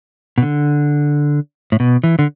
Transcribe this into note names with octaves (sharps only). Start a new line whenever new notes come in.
B2
D3
A2
B2
E3
D3